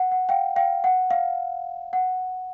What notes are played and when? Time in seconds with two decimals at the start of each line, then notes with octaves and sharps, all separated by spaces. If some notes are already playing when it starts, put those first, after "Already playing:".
Already playing: F#5
0.12 F#5
0.29 F5 G5
0.56 F5 G5
0.84 F#5
1.11 F5
1.93 F#5